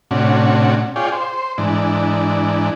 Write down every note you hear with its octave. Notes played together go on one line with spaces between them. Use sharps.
A2 C3 C#4 D4 F#4
F4 G#4 C#5 D5 G5
C5
G#2 E3 D4